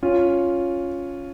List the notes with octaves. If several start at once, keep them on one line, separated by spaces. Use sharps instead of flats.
C#4 F4